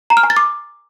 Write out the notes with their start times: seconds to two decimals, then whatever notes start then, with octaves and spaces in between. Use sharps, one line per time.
0.10 A#5
0.17 F6
0.23 G#5
0.30 A6
0.37 D6